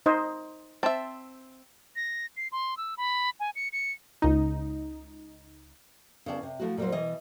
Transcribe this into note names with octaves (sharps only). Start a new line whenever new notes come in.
D#4 C5 D#5
C4 E5 A5
A#6
C7
C6
E6
B5
G#5
C#7
C#7
C#2 D#4
C#3 B3 E4 D5 F#5 A5
C3
F3 A3 E4 F#4
A#2 F#3 G3 E4 A#4 C5
B2 E3 D#5